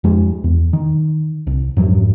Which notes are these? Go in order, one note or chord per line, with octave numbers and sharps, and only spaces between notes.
F2 G#3
E2
D#3
C2
F2 G#2 F#3